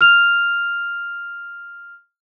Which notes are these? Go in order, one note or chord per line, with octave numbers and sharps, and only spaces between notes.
F6 F7